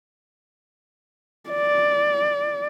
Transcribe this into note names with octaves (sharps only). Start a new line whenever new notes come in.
D5